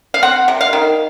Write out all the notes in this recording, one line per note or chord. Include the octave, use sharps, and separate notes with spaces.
F5
C4 F#5
C3
F5
D#3